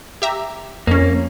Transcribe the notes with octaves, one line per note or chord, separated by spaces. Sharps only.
G4 E5 A#5
F2 A#3 C#4